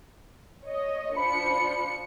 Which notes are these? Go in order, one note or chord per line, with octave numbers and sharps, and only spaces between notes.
C#5 D#5
F3 D4 B5 C#7